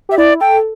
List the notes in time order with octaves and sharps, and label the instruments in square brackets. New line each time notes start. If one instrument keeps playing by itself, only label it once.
[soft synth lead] G4 [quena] E5
[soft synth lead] E4 [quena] D5
[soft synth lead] A4 [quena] G5